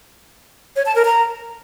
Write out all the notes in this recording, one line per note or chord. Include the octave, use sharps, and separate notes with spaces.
C#5
A5
A#4
A#5